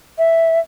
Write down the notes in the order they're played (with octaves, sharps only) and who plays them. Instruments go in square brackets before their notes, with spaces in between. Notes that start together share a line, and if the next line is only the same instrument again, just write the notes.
[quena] E5